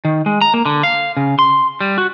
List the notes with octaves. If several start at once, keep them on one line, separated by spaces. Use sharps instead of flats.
D#3
G#3
A#5
A#3
D3
F5
C#3
C6
G3
F#4